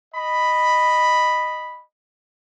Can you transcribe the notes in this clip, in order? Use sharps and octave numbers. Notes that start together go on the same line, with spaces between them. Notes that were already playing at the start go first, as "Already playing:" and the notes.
D#5 B5